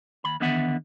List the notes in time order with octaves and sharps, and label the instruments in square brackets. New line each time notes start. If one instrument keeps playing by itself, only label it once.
[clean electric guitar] D#2 B5
E2 D3 D#3 B3 E5 F#5